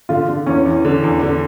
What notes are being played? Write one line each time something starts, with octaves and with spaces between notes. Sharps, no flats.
D3 F4
D3
E2 C#4
E2
D3
E2
D3